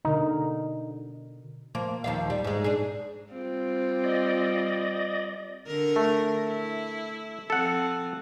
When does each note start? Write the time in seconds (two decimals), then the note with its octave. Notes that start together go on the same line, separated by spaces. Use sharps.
0.05 B2 D3 D#4 A#4
1.75 F3 A#3
2.04 D#2 F3 F5
2.30 G3
2.44 G#2 G#3
2.64 D4 G#4
3.32 G3 C4 F4
4.04 D5 D#5
5.67 D3 A#4
5.96 A3
6.46 E4
7.50 F3 C4 A4 F#5